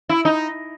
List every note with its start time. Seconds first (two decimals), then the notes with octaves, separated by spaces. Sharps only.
0.09 E4
0.25 D#4